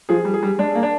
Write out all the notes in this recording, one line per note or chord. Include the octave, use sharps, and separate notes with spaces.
F3 G#4
G3
G#4
G3
G#3 D4
A#3
D4